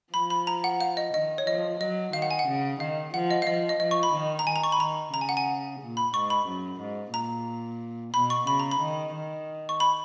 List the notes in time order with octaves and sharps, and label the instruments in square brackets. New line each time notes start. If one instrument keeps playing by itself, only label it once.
[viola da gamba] F3 [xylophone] B5
[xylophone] B5
A#5
F#5
F5
D#5
[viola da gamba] D#3 [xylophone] D#5
[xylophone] C#5
[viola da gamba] F3 [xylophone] D#5
[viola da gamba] F#3 [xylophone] D#5
[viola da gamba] D#3 [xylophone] F5
[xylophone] F#5
G#5
F#5
[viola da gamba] C#3
[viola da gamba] D#3 [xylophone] F5
[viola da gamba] F3 [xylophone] F#5
[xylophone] D#5
F5
[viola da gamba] F3 [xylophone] D#5
[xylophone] D#5
[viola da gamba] F3 [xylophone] D#5
[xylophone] C#6
B5
[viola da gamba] D#3
[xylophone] A#5
[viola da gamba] D#3 [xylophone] G#5
[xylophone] A#5
C#6
B5
[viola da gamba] D#3 [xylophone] A#5
[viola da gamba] C#3 [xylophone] A#5
[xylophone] G#5
F#5
G#5
[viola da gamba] A#2
[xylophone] B5
[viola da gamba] G#2 [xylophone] C#6
[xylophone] B5
[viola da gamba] F#2
G#2
[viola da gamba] A#2 [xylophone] A#5
[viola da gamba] B2 [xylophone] B5
[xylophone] C#6
[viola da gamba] C#3 [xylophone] B5
[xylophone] A#5
B5
[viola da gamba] D#3
D#3
[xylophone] C#6
B5